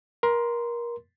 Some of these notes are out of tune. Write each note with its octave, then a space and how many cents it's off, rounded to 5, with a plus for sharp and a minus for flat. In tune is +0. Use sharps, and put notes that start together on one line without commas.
A#4 +25 C6 -10